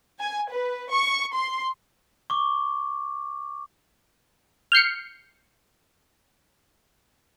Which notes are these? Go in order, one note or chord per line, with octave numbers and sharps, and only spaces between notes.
G#5
B4
C#6
C6
C#6 D6
F6 G6 C7 C#7